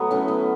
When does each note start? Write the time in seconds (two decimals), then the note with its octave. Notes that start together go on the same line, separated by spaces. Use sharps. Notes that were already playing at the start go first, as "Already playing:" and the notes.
Already playing: F#3 A3 B3
0.11 A2 C#4
0.28 B3